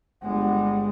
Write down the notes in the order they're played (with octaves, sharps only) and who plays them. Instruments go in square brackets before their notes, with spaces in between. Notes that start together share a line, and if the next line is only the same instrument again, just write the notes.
[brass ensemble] G1 F#5 [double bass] G3 G#3